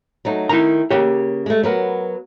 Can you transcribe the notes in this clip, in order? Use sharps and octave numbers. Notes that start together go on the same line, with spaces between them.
F#3 A3 D#4
D#3 E4 A#5
C#3 A#3 G4 C#5
G#3 A3
F#3 B3 A#4